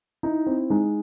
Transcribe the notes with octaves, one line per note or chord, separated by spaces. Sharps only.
D#4 E4
C4
G#3 D#4